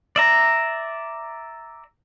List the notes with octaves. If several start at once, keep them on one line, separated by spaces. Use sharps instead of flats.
D5 E5 A#5